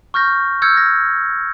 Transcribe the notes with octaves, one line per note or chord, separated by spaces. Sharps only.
C#6 F6 G6 A#6
E6 F6 G6 G#6 C#7
A#6